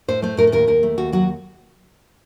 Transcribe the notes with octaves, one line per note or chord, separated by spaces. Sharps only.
A2 C5
A3 C5
A2 A#4
A4
D#2 A#4
D#2 A#4
A3
D#2 F#4
F#3 F#4